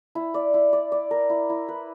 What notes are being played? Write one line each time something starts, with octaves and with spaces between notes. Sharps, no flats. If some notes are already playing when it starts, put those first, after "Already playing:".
E4
D5
E4
D5
D5
A#4
E4
E4
B4